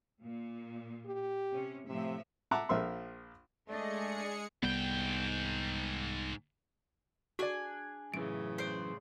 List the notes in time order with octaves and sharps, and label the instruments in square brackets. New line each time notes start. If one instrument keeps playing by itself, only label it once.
[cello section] A#2
[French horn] G4
[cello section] C3 C#4
[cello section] A2 F3 E5 [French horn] C3
[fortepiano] E5 F#5 A5 A#5 D6
A#1 F3 A#4 E5 C6
[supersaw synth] G#3 G#4 C#7 [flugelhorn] A3 [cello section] D4 D#5 [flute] D5
[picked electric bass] C2 G3 B3 [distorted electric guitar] G#2 G5
[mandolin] D4 G#4 G#5 [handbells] F#4 D5
[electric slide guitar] F#2 E3 [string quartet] A2 C#3 [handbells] D7
[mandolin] C5 D5